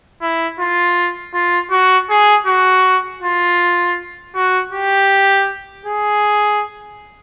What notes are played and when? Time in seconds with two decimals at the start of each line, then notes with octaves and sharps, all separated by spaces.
0.21 E4
0.59 F4
1.34 F4
1.71 F#4
2.10 G#4
2.46 F#4
3.22 F4
4.35 F#4
4.72 G4
5.86 G#4